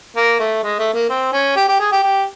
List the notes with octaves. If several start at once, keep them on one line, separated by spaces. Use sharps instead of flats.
A#3
A3
G#3
A3
A#3
C4
C#4
G4
G4
G#4
G4
G4